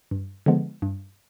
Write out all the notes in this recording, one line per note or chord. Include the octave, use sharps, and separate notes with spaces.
G2
D3 F3 G#3 B3
G2